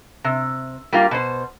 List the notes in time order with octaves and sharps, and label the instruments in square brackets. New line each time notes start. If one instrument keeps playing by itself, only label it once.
[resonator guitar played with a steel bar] C3
G3 A#3 F4
B2 C5